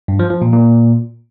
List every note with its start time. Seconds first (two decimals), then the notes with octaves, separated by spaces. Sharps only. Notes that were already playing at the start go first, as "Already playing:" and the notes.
0.08 G2
0.19 F3
0.31 F3
0.42 A#2
0.53 A#2